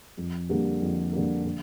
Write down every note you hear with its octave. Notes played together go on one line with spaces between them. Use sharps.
F2
D3 G3 A#3
F2
D3 G3 A#3
D3